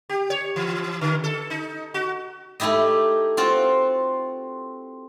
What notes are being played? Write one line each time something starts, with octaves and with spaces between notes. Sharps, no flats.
G4
C#5
E3
D3
A4
D#4
F#4
A3 D#4 E4 G4 D#5
C4 F4 F#4